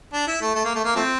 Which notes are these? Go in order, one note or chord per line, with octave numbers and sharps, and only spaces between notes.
D4
E4
A3
A3
A#3
A3
A#3
F3 A3 C4